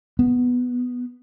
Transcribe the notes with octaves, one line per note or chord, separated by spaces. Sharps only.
B3